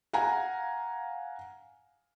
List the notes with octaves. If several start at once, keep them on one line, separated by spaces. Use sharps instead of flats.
F5 F#5 G#5 A#5